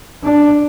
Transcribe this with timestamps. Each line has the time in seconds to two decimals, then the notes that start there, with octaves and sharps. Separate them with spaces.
0.23 D4